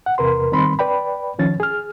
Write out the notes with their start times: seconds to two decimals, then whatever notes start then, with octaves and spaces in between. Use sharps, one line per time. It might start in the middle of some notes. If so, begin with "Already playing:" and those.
0.06 F#5
0.18 E2 C3 A#4 B4 C6
0.52 D#3 G3 C4 B5 C6
0.79 B4 D5 G5 B5
1.39 D#3 F3 C#4 A6
1.60 G#4 F6